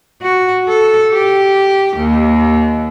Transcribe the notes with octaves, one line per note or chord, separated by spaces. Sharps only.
F#4
A4
G4
D#2